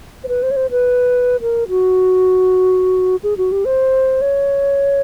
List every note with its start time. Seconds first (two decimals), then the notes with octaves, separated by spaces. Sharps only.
0.24 C5
0.28 B4
0.43 C5
0.51 C#5
0.56 C5
0.71 B4
1.41 A#4
1.69 F#4
3.23 G#4
3.37 F#4
3.52 G4
3.65 C5
4.21 C#5